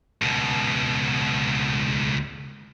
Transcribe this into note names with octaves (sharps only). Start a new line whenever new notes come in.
C#2 B2